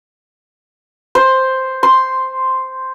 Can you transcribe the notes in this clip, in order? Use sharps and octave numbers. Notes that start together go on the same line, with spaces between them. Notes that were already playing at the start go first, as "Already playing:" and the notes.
C5
C6